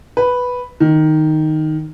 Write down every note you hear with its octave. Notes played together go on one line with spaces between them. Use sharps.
B4
D#3